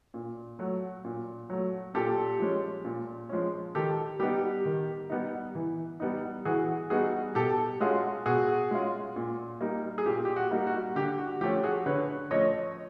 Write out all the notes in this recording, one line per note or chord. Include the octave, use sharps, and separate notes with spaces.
A#2
F#3 A3
A#2
F#3 A3
A#2 G4 A4
F3 G#3 C#4
A#2
F3 G#3 C#4
D#3 G4 A4
G3 B3 D#4 G4
D#3
G3 B3 D#4
E3
G3 B3 D#4
E3 F#4 G#4
G3 B3 D#4 F#4 G#4
B2 G4 A4
G#3 C#4 F4 F#4 G#4
B2 F#4 G#4
G#3 C#4 F4
A#2
G3 A#3 D#4
G#4
A#2 G4
G4
F#4
G3 A#3 D#4
F#4
D3 G4
F#4
F3 A3 C#4 G4
F#4 G#4
D3 B4 C#5
F3 A3 C#4 C#5 D#5